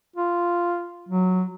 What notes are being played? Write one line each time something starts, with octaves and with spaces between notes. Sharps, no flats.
F4
F#3